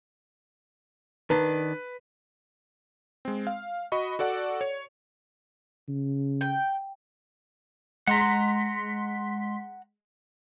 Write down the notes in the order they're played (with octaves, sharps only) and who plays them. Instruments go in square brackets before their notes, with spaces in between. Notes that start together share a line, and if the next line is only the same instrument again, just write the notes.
[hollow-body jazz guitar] D#3 D4 [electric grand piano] B4
[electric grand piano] G#3 C4
F5
F#4 D#5 B5 C#6
F#4 A4 D5 F#5
C#5
[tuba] C#3
[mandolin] G5
[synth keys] G#3 C6 B6 [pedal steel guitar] F#5 A#5